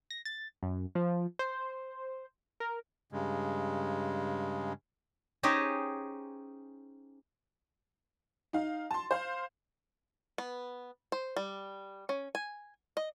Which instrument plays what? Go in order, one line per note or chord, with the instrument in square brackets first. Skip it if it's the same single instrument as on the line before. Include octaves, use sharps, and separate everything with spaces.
[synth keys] A#6
A6
F#2
F3
C5
A#4
[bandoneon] G2 C#3 G#3
[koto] C#4 D#4 G4 G#4 C5 D#5
[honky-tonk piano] D#4 F5
A5 C6
C5 F5
[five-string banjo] B3
C5
G3
C#4
G#5
D#5